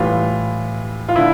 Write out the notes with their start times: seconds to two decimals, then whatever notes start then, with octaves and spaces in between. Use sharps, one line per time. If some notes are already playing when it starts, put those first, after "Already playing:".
Already playing: A2 E3 G3 F4
1.09 F4
1.16 D3 E4